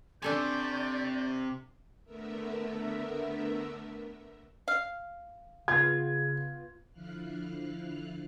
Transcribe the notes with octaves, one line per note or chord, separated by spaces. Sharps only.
C3 D4 A4 D5 G#5 C#6 G6
D3 A3 B3 A#4 E5
F5
C#3 B3 F4 G#6
D3 F3 E4 F5 F6 F#6